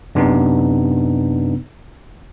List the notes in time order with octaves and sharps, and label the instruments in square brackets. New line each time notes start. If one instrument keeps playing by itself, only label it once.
[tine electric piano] F#2 C3 B3 D4 D#4